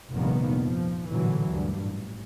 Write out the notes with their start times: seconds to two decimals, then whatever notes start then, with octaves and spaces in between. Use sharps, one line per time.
0.12 F1 A#1 G2 D#3 A#3 B3
0.63 F3
1.07 A1 A#2 D3 E3 F#3
1.51 D2 G2 A#2
1.80 A1